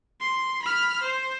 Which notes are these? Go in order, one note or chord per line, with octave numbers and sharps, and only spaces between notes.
C6
B5 F6
C5